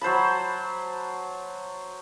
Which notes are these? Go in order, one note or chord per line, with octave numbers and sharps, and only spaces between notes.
F#3 C5 A5 B5